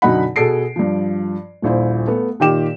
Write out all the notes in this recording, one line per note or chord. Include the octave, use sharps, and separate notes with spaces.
F#2 B2 D3 D#4 F#5 B5
B2 G#4 A4 C7 D7
G2 F3
D#1 A#1 E4 C5
A3 B3
A#2 D#3 G4 E7